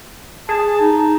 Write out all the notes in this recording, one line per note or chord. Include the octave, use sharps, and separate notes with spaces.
G#4 A5
D#4